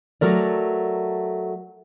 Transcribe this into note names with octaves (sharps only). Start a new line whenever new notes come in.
F#3 A3 A#4 D5